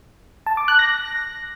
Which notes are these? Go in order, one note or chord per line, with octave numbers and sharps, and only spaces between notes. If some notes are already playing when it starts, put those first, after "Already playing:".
A5
D6
F#6
A#6